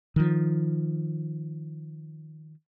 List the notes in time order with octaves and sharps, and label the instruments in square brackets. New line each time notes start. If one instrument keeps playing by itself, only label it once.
[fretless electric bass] D#3 F3